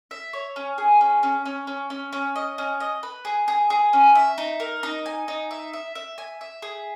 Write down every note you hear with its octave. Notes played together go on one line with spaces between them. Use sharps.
E5
C#5
C#4
G#4
C#4
C#4
C#4
C#4
C#4
C#4
D#5
C#4
D#5
B4
G#4
G#4
G#4
C#4
E5
D#4
A#4
D#4
G#5
D#4
E5
E5
E5
G#5
E5
G#4